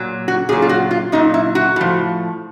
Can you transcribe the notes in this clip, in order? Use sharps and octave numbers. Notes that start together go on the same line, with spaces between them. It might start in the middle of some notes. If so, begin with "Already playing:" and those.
Already playing: A#2 F#3
F#4
A#2 F#3 G#4
F4
F#4
F4
A#2 F#3 D#4
E4
F#4
A2 F3